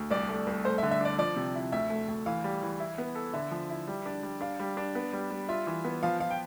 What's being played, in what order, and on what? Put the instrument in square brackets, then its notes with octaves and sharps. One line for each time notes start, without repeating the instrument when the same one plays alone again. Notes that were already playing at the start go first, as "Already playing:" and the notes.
Already playing: [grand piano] D2
[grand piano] C2 [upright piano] D5
[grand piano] A3
C2
[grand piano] A3 [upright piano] C5
[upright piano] E5
[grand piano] D3
[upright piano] E5
[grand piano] D4 [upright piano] D5
[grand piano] F3 [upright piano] D5
[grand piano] C3
E4
[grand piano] D2 [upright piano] E5
[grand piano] A3
D2
[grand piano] E3 [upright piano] F5
[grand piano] G3
E3
E4
B3
A4
[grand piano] D3 [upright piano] E5
[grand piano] F3
E4
G3
D4
G3
[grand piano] D4 [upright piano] F5
[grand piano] G3
D4
B3
G3
G3
[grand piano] F4 [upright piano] E5
[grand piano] E3
B3
[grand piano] F3 [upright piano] F5
[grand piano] F3 [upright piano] F5
[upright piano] G5